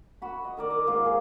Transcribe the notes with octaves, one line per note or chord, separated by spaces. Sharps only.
F#4 B5
D#5
D#3 A#4 D5
D#5
G#2 A#3 F4 D6
G#4